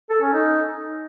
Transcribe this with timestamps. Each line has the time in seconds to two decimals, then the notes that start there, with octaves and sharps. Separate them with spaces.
0.10 A4
0.22 C#4
0.33 D#4